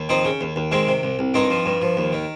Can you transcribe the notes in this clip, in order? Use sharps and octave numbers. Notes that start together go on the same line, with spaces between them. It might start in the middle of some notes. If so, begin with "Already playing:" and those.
Already playing: D#2
F3 C4 D#4
C#3
D#2
D#2
D#3 G#3 C4
C3
C2
C2
G2 C4 D#4
F3
G2
F3
D#2
D#3